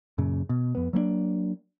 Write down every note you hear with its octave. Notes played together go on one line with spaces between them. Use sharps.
F#2 A#2 C#3
B2
F2 B3
F#3 A#3 B3 D4